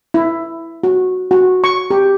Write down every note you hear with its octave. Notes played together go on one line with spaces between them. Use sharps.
E4
F#4
F#4
C#6
G4